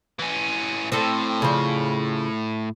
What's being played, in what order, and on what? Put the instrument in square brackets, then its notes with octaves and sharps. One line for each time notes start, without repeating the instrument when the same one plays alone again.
[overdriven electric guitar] E3 C#4
[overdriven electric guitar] A2 [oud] C4 A4
[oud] C#3 F3